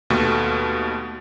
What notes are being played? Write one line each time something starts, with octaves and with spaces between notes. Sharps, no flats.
D#2 B2 A3